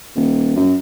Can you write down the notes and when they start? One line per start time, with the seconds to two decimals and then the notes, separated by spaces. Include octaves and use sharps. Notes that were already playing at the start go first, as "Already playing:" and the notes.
0.16 D#1
0.56 F#2